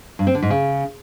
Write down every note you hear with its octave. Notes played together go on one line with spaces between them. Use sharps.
G2
C4
D3
G#2
C#3